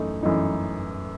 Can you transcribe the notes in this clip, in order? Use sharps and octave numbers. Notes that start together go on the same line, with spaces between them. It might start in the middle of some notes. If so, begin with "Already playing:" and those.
Already playing: F#2 E3 A3 D#4
F#2 E3 A3 D#4